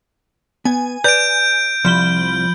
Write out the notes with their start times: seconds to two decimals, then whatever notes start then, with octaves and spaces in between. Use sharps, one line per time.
0.65 B3 G#5
1.04 B4 D5 A#5 G6 D7
1.85 C2 F3 B5 G7